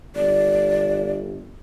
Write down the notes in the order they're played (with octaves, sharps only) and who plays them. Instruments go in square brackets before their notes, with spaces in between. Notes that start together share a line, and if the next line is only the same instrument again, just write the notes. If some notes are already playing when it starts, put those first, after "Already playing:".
[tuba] G1 [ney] D5